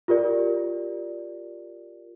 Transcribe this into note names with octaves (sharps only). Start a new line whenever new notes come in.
F4 G4 A#4 D5